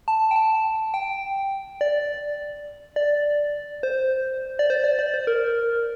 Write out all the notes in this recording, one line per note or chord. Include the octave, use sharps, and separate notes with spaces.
A5
G5
A5
G5
D5
D5
C5
D5
C5
D5
D5
C5
A#4